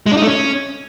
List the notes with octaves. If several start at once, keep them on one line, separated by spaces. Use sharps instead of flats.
G#3
D4
D#4
A3
C#4